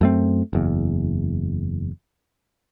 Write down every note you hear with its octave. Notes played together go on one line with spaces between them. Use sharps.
F#2 A3 C4
F#1 E2